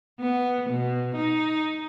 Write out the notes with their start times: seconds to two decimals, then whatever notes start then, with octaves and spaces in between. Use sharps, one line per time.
0.20 B3
0.70 B2
1.16 D#4